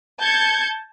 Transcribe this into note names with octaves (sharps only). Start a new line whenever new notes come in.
A5 G6 G#6 C#7